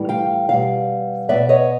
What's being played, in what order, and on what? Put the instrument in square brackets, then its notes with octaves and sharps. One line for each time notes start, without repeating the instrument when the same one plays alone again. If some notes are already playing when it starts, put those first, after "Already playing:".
Already playing: [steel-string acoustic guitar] A2 E3 G3
F5 G5
E2 B2 G3 F5
G#3 B3 D5 E5
B2
C#5 D#5